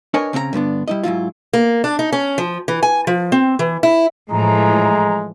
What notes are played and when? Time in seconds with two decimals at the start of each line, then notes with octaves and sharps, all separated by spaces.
0.14 D4 A#4 B4 C#5 D#5 G#5
0.33 C#3 C4 C#4 E4 A#5
0.53 G2 D3 B3 D4
0.88 G3 E4 D#5
1.03 G#2 F#3 E4 F4
1.53 A#3
1.84 D4
1.99 D#4
2.12 C#4
2.38 F3
2.68 E3
2.83 G#5
3.07 F3
3.32 C4
3.59 E3
3.83 E4
4.30 A2 E3 F3 G#3 A#5